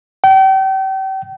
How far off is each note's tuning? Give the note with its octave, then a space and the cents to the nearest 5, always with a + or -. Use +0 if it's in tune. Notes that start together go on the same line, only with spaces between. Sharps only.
G5 -35